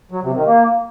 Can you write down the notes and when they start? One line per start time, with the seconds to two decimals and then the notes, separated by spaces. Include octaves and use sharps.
0.11 F#3
0.23 C3
0.34 D#3
0.46 A#3